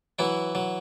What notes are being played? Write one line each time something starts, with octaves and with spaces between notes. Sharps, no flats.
E3 F#3 E4
F#3